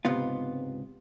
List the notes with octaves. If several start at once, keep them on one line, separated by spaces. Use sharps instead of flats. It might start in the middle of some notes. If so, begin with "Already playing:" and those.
C#2 G#2 C3 B3 F4